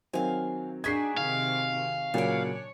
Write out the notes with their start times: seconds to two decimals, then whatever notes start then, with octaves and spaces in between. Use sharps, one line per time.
0.14 D#3 F#3 C4 F5 G#5
0.84 D4 D#4 F#4 G#4 G#6 B6 C7
1.17 C3 D#3 F5
2.14 A#2 C#3 F#3 D4 C#5 D5